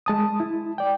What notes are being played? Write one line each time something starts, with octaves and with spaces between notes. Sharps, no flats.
G#3 A5 D#6
E4
D5 G5